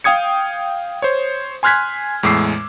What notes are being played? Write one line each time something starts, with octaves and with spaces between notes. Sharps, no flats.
F5 G5 D#6 G#6 C#7
C5 C#5
G#5 C6 F6 F#6 G#6 B6
E2 A2 G#3 D6 E6 C7